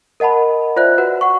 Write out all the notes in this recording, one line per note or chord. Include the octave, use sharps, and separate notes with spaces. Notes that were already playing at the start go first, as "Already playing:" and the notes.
A#4 D#5 F#5 A5 B5
F4 C5 D5 E5 F#6
F#4 B4 F#5
F#5 C#6